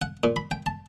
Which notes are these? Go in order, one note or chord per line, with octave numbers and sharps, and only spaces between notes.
F#5
A#2
B5
G5
A5